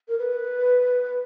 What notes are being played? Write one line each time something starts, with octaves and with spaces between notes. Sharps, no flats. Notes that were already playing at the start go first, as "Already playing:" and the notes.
A#4
B4